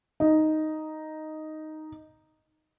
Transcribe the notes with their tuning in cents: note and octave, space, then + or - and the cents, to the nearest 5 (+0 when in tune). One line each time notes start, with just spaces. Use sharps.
D#4 +0